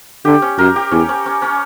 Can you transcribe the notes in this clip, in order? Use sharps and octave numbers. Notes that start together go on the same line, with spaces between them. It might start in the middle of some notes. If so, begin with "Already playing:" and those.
D3 G4
C#4
F#2 A#4
G4
E2 C#4
C#4
C#4
C#4